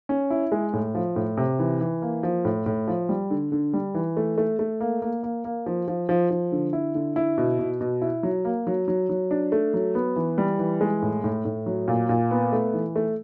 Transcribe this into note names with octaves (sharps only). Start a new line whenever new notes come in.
C#4
E4
G#3
A2
F3
A2
C3
E3
E3
A#3
F3
A2
A2
F3
G3
D3
D3
G3
E3
A3
A3
A3
A#3
A#3
A#3
A#3
F3
F3
F3
F3
D3
E4
D3
E4
B2
B2
B2
E4
F#3
A#3
F#3
F#3
F#3
D4
A3
F#3
B3
E3
G3
E3
G#3
A2
A2
A2
F#3
A#2
A#2
B3
A3
E3
A3